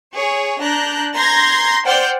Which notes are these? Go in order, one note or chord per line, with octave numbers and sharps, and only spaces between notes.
G#4 C#5
D4 A#5 F#6 G6
A#5 C6 G6 G#6 A#6
C5 D5 F#5 G5 F6 G6